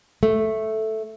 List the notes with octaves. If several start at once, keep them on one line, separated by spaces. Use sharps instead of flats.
A3